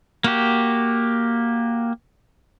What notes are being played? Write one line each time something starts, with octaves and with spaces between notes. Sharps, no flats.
A#3 F#4 G4